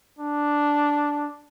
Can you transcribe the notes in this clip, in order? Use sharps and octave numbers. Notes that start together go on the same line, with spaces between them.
D4